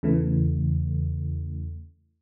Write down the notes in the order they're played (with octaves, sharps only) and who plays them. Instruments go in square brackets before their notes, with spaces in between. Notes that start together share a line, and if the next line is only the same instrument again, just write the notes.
[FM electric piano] E2 C#3 E3 A3